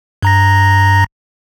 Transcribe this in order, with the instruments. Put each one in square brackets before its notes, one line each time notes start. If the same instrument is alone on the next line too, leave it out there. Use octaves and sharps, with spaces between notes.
[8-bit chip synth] G2 A#5 A#6